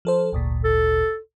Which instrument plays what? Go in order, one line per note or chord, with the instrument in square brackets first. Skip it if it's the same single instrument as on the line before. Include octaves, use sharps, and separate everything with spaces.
[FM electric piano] F3 A4 C5
G#1 D2 A#2
[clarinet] A4